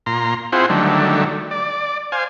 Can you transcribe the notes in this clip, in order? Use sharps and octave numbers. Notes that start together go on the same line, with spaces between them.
A#2 A#5 C6
C4 E4 F4 G#4 C5 F#5
D3 D#3 F#3 G3 A3
D5
C5 F5 G#5